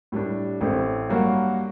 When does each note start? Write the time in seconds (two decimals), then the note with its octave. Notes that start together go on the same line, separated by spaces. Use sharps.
0.12 A2 G3 D4
0.61 A1 A2 A3 C4
1.09 G2 F#3 A#3 F#4